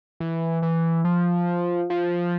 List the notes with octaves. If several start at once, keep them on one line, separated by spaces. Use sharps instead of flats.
E3
E3
F3
F3